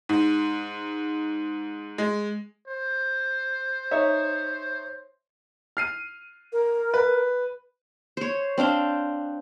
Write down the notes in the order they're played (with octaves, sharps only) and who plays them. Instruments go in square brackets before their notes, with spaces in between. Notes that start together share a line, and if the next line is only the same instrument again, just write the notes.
[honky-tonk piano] G#2
G#3
[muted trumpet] C5
[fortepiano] D#4 C#5 E5
[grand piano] F6 C7 D#7
[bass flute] A#4
[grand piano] B4
[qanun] C5 C#5
C4 D4 F5 G5